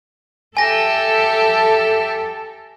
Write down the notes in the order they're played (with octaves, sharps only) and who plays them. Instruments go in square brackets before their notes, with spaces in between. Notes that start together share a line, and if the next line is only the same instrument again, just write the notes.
[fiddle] G4 E5 [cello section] A4 [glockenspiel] G#5 A#6